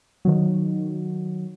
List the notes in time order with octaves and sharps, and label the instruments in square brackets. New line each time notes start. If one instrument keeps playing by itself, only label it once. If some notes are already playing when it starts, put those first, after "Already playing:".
[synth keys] D#3 F#3